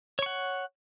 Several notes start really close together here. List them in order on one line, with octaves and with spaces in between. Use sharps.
C#5 C#6 F#5